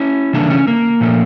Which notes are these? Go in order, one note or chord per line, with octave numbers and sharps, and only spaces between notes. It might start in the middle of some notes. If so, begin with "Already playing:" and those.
Already playing: C#4 E4
C#3 E3 A3 A#3 D4
C#4
A#3
A#2 F3 A3